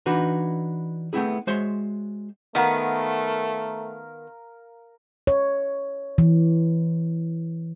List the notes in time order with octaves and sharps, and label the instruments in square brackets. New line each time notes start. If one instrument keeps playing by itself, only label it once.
[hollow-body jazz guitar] E3 D4 D#4 F#4 B4
A3 B3 C4 E4 G#4
G#3 F#4 C5 C#5 E5 C6
[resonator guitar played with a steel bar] D#3 B3 F#5 [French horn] A3 [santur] A#4 F5
[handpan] C#5
E3